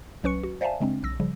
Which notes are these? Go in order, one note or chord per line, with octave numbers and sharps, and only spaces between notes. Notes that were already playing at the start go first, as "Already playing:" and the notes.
C2 F#3 C#4 B4 C#6 C#7
F#4
C5 D5 E5 F5 G#5 A5
C#3 G#3 C4 D4
B1 E6 A#6
C#3 F3 G3